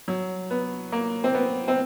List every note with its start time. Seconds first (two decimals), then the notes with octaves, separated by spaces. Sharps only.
0.08 F#3
0.50 B3
0.92 A#3
1.24 C4
1.34 B3
1.68 C4